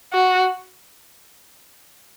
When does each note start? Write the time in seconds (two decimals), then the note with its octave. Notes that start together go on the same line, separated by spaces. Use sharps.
0.13 F#4